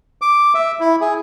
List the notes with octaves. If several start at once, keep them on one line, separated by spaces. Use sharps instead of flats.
D6
E5
E4
G#4